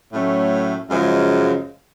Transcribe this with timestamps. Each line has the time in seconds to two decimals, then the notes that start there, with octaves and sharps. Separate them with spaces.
0.13 A2 F#3 A3 C#4
0.90 F#2 C#3 F3 G#3